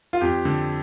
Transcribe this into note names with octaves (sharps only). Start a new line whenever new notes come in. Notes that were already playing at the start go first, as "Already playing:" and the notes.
F4
F2 G4
D3